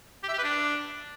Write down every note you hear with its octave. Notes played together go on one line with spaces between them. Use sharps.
G4
E5
G4
B4
D4